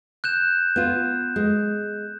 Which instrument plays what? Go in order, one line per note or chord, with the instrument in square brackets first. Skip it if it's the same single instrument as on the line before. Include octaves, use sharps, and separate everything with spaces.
[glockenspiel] F#6 G6 E7
[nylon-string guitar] B3 F4
G#3